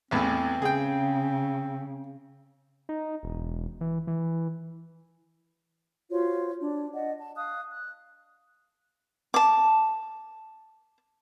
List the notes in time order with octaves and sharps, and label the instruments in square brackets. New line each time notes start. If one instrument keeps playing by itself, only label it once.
[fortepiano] A1 E2 A2 [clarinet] C4
[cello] C#3 [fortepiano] G#4 G5
[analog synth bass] D#4
E1
E3
E3
[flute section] F4 F#4 C5 C#5
D4
D5 D#5 F#5
A5
F5 D#6 F#6
F#6
[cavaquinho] A5 D6